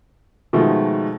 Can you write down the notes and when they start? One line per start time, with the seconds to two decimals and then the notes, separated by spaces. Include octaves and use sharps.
0.53 B2 D#3 F3 G#3 A3